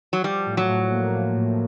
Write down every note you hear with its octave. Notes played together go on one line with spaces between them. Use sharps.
F#3
F3 G3
A2
F#3
A2
A#3
F3
A2